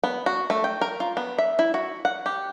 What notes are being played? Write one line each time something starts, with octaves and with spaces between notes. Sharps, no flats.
B3
F#4
A3
G5
A#4
F4
B3
E5
E4
F#4
F#5
G4